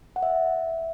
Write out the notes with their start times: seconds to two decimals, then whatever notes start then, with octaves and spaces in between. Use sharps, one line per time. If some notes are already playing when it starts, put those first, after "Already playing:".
0.16 F#5
0.22 E5